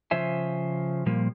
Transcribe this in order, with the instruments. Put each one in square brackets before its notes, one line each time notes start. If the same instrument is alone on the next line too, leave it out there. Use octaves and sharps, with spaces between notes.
[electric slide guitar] C#3 F3 C5 E5 G#5
A#2 F3 G3 A#3